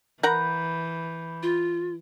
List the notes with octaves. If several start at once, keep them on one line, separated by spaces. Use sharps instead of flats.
E3 A#4 F#5 A#5 B5 G6
F4